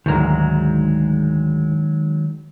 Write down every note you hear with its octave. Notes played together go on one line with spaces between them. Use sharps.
D2 G#2 D#3 F#3 G#3 A#4